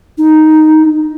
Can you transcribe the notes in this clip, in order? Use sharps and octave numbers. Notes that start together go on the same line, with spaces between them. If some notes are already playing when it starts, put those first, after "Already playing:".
D#4